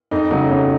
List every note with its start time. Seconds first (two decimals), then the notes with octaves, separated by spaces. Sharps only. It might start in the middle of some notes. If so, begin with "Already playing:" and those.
0.11 F2 D#4
0.31 C#3 F#3 A3 D#4
0.50 F2 C#4